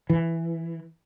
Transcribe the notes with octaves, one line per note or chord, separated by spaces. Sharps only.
E3